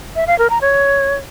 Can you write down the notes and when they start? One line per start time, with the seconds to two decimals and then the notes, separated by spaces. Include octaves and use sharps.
0.16 E5
0.27 F5
0.39 A#4
0.50 A#5
0.61 C#5